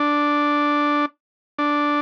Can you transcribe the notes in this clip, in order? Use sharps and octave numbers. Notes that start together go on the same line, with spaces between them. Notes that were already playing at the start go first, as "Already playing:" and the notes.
Already playing: D4
D4